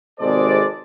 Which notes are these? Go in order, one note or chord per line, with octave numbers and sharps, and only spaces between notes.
G#1 C3 G#3 A4 C5 D5